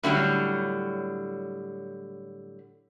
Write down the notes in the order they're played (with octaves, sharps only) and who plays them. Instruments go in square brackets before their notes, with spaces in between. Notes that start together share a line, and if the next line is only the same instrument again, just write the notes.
[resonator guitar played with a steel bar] A2 D3 F#3 G3